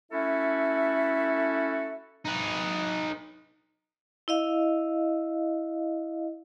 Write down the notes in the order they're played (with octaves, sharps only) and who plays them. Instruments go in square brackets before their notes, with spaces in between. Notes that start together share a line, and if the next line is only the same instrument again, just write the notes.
[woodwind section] A3 C#4 E4 F#4 A4 E5
[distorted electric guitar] D#4 B4
[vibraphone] E4 D#5 F5